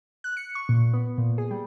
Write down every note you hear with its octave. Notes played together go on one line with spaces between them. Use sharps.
F#6
C#7
C#6
A#2
B3
A#2
G#4
G3